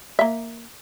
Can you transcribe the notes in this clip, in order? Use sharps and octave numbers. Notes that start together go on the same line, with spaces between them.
A#3 E5